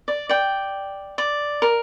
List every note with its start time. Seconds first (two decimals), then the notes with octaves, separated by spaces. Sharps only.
0.08 D5
0.29 D5 G5
1.18 D5
1.62 A#4